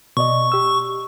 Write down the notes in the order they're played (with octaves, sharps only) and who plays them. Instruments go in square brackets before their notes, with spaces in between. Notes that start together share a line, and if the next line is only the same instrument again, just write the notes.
[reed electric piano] B2 D5 D#5 [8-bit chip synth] C#6
[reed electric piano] G4 E6